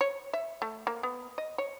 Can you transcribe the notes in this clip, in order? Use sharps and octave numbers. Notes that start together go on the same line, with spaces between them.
C#5
E5
A3
A#3
B3
D#5
C#5